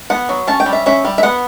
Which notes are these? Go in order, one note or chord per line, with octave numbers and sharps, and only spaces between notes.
B3 F#5
F#3
C#4 A5
G5
G3
E5
C#4 E5
G3
E5
B3 F#5